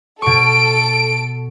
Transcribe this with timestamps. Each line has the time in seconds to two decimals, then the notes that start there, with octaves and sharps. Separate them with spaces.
0.22 B2 A4 C#6 D7